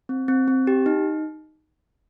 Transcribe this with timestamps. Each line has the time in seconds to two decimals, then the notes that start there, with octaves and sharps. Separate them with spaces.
0.09 C4
0.28 C4
0.48 C4
0.67 G4
0.86 D#4